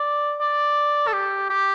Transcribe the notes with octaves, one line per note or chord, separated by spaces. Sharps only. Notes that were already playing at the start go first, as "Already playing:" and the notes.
Already playing: D5
D5
A4
G4
G4